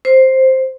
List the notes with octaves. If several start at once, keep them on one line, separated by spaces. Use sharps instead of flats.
C5